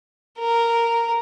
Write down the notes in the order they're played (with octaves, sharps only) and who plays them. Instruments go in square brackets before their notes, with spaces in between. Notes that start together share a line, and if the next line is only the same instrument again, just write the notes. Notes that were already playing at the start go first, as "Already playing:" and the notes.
[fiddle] A#4